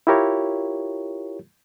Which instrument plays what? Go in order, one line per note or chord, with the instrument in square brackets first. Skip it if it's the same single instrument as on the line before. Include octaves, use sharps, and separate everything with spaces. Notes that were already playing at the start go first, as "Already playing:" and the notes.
[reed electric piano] E4 F4 G4 A#4 C#5